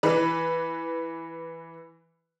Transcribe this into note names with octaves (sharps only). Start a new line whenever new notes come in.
E3 B4